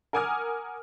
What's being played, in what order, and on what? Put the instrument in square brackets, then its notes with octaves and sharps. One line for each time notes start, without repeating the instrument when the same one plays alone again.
[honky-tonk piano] A#4 F#5 G#5 D6 D#6 F6